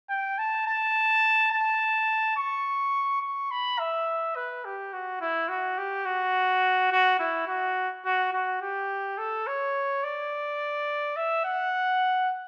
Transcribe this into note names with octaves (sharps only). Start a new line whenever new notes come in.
G5
A5
A5
A5
C#6
C#6
B5
E5
B4
G4
F#4
E4
F#4
G4
F#4
F#4
E4
F#4
F#4
F#4
G4
A4
C#5
D5
E5
F#5